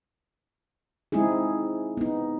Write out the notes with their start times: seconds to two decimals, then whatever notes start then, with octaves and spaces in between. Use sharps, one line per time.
1.12 G#3 C4 D#4 E4 G#4
1.97 B3 D#4